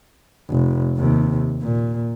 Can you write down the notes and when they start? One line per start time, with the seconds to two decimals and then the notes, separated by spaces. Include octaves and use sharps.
0.50 F1
0.97 D#2 C3
1.62 A#2